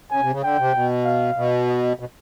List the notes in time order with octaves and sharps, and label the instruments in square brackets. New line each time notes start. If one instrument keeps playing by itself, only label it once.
[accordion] C#3 [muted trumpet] G#5
[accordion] C3
C#3
[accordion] D3 [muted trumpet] G5
[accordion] C3
B2
[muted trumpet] F5
[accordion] B2
[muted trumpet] D#5
[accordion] B2